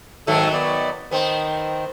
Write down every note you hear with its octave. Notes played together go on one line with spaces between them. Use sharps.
G#2 D#3 F#3 A3 A4
B3 D5
D#3 B3 C4